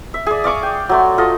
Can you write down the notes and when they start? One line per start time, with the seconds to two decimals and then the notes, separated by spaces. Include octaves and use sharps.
0.14 E5
0.27 G#4 D5
0.44 D5 F5 C#6 D6
0.63 G5
0.89 F#3 A3 C6
1.18 F4 A4 D#5